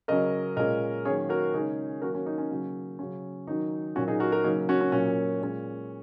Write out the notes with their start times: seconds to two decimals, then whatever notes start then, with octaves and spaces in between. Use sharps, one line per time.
0.08 C#3 F#3 C#4 A#4 D#5
0.57 A#2 G#3 C#4 A#4 D#5
1.05 D#3 F#3 A#3 C#4 G#4 C#5
1.29 F#4 A#4
1.54 C#3 G#3 C#4 D#4 G#4
2.02 D#3 F#3 A#3 C#4 F#4 A#4
2.14 C#4 F#4
2.26 D#4
2.38 C#4
2.51 C#3 F#3 A#3
2.99 C#3 F#3 C#4
3.47 D#3 F#3 C#4 D#4
3.96 A#2 F#3 C#4 F#4
4.08 D#4 G#4
4.20 F#4 A#4
4.32 F#4 A#4
4.44 C#3 F#3 A#3 C#4 D#4
4.69 C#4 F#4
4.81 C#4
4.92 A#2 F#3 A#3 C#4
5.41 A#2 G#3 C#4